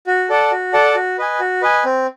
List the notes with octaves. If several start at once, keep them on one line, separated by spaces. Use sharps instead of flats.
F#4
A4 D5 F#5 A5
F#4
A4 D5 F#5 A5
F#4
B4 D#5 G#5
F#4
B4 D#5 G#5
C4